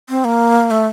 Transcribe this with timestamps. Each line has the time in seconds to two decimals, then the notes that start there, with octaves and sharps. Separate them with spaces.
0.09 C4
0.25 A#3
0.71 A3